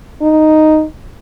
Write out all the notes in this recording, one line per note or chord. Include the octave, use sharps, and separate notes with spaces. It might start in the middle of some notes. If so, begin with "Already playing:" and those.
D#4